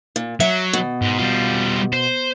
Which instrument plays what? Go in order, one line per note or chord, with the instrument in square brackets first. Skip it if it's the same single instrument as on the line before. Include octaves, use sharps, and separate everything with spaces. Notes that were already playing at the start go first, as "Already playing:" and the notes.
[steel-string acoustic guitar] A#2
[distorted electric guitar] F#3 [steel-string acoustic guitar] E5
[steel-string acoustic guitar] B2
[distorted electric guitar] G#2
G3 F4
C5